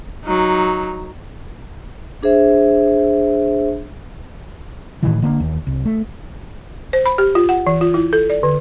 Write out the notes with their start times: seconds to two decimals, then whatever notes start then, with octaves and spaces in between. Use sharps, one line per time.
0.25 F#3 D#4
2.23 D4 G#4 C5 E5
5.03 A2 C3 D#3 E3
5.22 D3 A#3 B3 D4
5.40 D#2
5.67 C2
5.85 A3
6.93 C5
7.06 B5
7.18 G4
7.35 F4
7.49 F#5
7.67 E3
7.81 F4
7.94 E4
8.13 A4
8.30 D5
8.43 D3